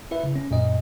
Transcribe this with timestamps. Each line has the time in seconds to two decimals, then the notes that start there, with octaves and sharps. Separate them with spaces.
0.11 E4 B4 E5
0.23 C#3
0.35 C#4
0.51 F#2 A#2 D#5